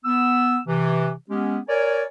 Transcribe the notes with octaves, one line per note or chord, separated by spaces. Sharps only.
B3 E6
C3 E3
G#3 B3 C#4 G4
A#4 C#5 D5 G#5